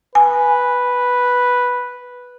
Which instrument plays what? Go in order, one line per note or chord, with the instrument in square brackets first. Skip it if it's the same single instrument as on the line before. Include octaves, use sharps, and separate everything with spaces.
[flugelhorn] B4 [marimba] G#5